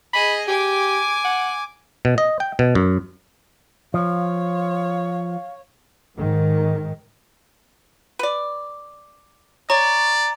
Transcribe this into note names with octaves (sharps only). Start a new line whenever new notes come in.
G#4 D#5 B5
G4 G#5 D6
F#5
B2
D#5
G5
B2
F#2
F3 C#5 F5
G#2 D#3
B4 D5
C#5 D5 A#5